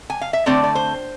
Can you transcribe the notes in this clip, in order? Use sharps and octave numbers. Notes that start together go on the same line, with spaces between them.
G#5
F5
E5
D3 A3 C4 D5
D5
C5